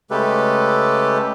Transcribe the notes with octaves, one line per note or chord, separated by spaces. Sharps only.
C#3 G#3 A3 G4 A4 B4